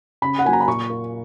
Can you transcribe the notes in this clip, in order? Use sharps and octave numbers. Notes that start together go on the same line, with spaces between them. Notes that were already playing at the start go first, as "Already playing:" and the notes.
C#3 B5
F#5
F#3 A#3 G#5
A#5
B5
A#2 C#6
A#3